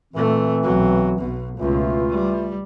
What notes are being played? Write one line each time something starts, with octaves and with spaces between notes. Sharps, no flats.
A#2 E3 A3 C4
B1 F#3
B1 B2
C#2 B2 E3 A3 F4
G3